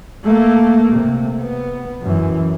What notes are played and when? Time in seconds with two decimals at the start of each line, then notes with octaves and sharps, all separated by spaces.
0.24 A3 A#3
0.93 C3
1.42 B3
2.02 F#2 E3